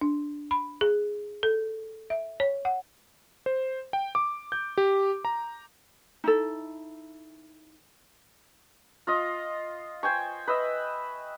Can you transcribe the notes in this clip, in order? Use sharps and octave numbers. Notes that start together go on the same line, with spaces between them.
D4
B5
G#4
A4
E5
C#5
F#5
C5
G5
D6
G6
G4
A#5
D#4 E4 A4
F4 D#5
C5 G5 G#5 C#6
B4 D#5 E5